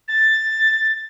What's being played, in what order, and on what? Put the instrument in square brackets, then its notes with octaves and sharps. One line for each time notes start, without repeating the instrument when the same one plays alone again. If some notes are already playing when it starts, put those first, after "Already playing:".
[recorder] A6